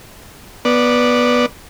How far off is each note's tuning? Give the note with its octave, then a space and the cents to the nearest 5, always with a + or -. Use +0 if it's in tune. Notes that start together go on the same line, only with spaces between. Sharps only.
B3 -10 D5 +0